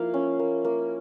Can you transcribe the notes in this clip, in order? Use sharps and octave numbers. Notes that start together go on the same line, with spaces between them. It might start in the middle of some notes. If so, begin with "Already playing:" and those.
Already playing: F3 A#3 E4 F5
C#4
A#3
A#3